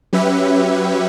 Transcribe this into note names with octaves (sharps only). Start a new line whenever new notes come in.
F#3 C#4 G4 B4 E5